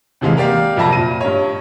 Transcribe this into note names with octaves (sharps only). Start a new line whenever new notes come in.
D#2 C3 E3 G#3 F5
A#3 G4 D5 F5
F2 C3 E5 A5 B5 A#6
A#2 D#7
G2 C#5